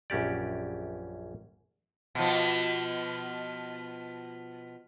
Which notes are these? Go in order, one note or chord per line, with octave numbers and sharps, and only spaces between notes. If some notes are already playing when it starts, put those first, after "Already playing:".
A#1 F#2 C#4 G4 D5
B2 F3